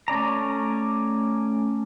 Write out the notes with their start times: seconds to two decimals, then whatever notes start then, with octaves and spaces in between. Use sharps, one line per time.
0.08 A3 C#4 D5 A#5